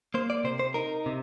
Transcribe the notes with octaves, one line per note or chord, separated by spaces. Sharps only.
A#3 C5
D5
C3 C5
C5
D#4 A#4
C3